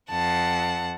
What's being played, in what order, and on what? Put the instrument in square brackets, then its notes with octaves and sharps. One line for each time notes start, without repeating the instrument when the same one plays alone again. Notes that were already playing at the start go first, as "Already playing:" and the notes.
[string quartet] F2 F#5 A5